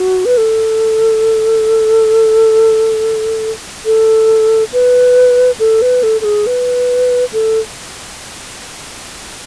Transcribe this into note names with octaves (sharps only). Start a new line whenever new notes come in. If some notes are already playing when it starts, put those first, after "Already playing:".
Already playing: F#4
B4
A4
A4
B4
A4
B4
A4
A4
G#4
B4
A4